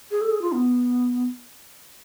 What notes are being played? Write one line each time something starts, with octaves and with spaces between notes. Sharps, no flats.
G#4
A4
G#4
F4
B3